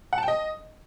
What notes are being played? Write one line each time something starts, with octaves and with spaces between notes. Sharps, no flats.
F#5
A5
G5
D#5